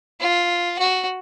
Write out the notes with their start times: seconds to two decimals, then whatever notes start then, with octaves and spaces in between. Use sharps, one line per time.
0.20 F4
0.79 F#4